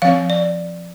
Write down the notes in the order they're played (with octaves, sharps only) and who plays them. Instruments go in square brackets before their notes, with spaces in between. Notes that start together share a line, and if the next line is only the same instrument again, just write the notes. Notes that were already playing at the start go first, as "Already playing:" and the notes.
[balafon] F3 C4 F5
D5